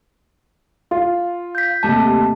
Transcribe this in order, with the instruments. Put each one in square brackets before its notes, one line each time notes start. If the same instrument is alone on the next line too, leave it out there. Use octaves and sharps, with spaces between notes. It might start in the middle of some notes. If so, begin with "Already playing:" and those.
[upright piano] F4
[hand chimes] G6 B6
[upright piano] D#2 C3 [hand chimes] A3 A5